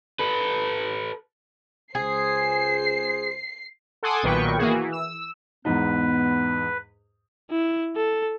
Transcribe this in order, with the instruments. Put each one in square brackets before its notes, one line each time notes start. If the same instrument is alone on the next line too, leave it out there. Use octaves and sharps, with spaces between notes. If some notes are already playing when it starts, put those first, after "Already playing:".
[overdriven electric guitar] A4 B4
[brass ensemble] C#2 C5 [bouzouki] G#4 [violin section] C7
[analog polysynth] A4 F#5 G#5 C6 D6 D#6
B1 A#2 D#3 B4 G5 C#6
E3 A#3 F#4 G#4
E3
E6
[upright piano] E2 G#2 D#4 [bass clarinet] B3 [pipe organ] B4
[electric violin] E4
A4